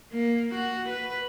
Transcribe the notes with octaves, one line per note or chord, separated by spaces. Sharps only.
A#3
F#4
B4